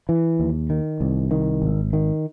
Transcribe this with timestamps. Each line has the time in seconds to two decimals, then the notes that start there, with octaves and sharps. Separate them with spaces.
0.09 E3
0.40 D#2
0.70 D#3
1.00 C2
1.31 D#3
1.62 G#1
1.93 D#3